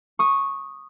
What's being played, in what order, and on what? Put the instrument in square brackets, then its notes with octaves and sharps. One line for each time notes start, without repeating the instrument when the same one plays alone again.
[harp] C#6 D#6